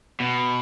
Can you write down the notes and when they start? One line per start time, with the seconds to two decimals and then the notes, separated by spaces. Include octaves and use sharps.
0.20 B2